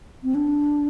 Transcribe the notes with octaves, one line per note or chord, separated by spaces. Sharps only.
C4
D4